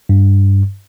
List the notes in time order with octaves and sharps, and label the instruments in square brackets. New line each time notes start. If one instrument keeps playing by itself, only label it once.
[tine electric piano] G2